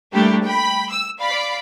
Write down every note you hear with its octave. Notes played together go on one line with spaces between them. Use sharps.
G3 A3 A#3 D4 E4 G4
G5 B5
E6
D5 F5 B5